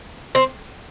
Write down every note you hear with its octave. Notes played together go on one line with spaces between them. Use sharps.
C4